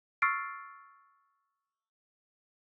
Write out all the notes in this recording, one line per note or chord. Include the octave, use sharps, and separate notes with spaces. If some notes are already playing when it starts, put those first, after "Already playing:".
C#6 E6 F6 A6 C7 D7